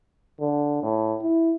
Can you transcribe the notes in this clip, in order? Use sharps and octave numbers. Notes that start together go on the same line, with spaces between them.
D3
A2
E4